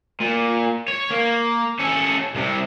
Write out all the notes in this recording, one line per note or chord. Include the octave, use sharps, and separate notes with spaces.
A#2
C#5
A#3
C#4 A4
C2 C3